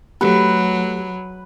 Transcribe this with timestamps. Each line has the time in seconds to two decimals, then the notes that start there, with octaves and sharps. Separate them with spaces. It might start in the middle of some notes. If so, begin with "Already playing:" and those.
0.21 F#3 A3 G4 B4